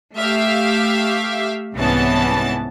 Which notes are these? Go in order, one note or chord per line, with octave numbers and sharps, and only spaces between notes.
A3 G4 E5 F5
C2 G#2 E3 B3 C#4 A5